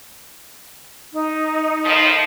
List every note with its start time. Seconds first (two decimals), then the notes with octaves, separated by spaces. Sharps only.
1.12 D#4
1.85 A2 D#3 F3